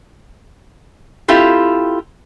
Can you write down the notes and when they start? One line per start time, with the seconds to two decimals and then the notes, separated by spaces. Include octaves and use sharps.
1.28 C4 E4 F4 G4 A4